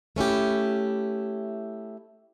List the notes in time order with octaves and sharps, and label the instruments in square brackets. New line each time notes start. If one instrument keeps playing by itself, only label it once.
[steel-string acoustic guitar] A3 C#4 E4 G4